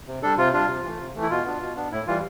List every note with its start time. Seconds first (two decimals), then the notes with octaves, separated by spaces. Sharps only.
0.07 C3
0.23 G3 D4 A4
0.38 C3 F4
0.53 G3 D4 F4
0.68 C3
0.84 E3 A3
0.99 C3
1.15 E3 A3
1.23 E4
1.30 B2 F4
1.45 B3 D4
1.61 B2
1.76 B3 D4
1.92 A2 E4
2.07 E3 G3 F4